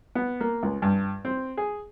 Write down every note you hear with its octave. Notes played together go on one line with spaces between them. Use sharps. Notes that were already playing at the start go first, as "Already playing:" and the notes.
B3
A#3
C#2
G2
C4
G#4